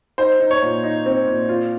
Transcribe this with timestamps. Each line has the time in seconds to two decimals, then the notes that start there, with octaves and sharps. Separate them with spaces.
0.18 D#4 C5
0.40 D#4
0.51 C#5
0.62 A#2
0.83 D#4
1.06 C4
1.27 A#2
1.49 F4